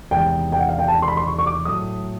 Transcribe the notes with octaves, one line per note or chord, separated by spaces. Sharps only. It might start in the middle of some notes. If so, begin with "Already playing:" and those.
E2 C3 D#3 G#3 B3 G5
G5
F#5
F5
G5
A5
C6
B5
C6
C#6
C#6
D6
A2 F#3 A3 D#6